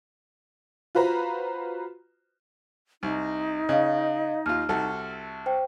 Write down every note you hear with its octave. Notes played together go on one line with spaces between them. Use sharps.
F4 F#4 B4 C5 A#5
C2 D#4
C#3 D#5 F5
D#2 F4 F6
C2 F#4 A4
C5 G5